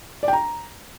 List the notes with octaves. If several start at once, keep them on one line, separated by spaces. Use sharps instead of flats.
D5
G5
A#5